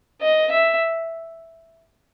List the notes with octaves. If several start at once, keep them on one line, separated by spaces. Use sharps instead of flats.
D#5
E5